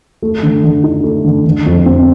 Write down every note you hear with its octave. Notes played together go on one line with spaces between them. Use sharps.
A3
D3
D3
D#4
A3
D3
D3
F2
C4